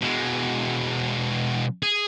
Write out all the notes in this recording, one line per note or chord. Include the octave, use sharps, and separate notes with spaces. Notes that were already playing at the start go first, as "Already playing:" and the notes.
B2 G#3
G#4